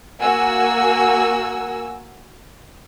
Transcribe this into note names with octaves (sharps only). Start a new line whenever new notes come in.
A#3 F#4 G#5 E6